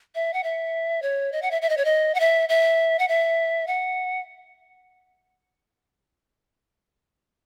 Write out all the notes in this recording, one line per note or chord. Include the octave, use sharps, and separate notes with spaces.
E5
F#5
E5
C#5
D#5
F#5
E5
E5
D#5
C#5
D#5
F#5
E5
E5
F#5
E5
F#5